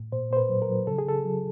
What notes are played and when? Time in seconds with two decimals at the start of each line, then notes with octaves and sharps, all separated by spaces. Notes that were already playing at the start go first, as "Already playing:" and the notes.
Already playing: A2
0.12 A#2 C5
0.31 A#2 C5
0.37 B4
0.49 F#3
0.62 A#4
0.69 F#3
0.87 C#3 A4
0.98 G#4
1.07 C#3 A4
1.25 F#3